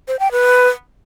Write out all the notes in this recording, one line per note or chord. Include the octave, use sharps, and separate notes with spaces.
C5
G5
B4